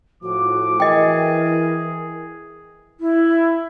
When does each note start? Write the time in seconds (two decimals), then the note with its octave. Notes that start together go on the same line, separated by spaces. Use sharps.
0.23 A2 F3 F#4 D6
0.80 E3 G#4 A#4 D#5 G5
3.00 E4